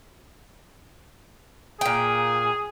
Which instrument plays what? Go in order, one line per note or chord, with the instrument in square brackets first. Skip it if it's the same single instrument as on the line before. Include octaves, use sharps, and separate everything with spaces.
[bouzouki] A#2 G5 [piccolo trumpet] G#4